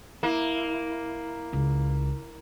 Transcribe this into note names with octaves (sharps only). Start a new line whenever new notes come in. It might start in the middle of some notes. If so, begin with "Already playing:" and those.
A#3 E4
C#2